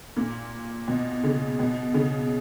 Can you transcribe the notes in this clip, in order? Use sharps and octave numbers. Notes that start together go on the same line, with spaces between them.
A#2
B2
C#3
B2
C#3